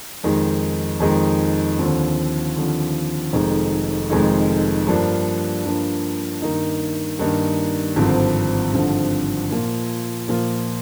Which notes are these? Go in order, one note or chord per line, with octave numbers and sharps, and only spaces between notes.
F2 D#3 G#3 D#4
F2 D#3 G#3 D#4
D#2 D3 F3 C4
D#2 D3 F3 C4
F1 F2 D#3 G#3 D#4
F1 F2 D#3 G#3 D#4
G2 F3 A#3 D4
G2 F3 A#3 D4
G2 D#3 A#3 D#4
G2 D#3 A#3 D#4
G#1 G2 D3 F3 C4
G#1 G2 D3 F3 C4
A#2 F3 A#3 F4
A#2 F3 A#3 F4